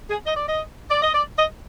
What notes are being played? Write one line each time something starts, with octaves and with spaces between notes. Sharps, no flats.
G#4
D#5
D5
D#5
D5
D#5
D5
D#5